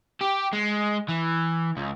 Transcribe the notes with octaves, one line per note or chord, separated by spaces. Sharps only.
G4
G#3
E3
C#2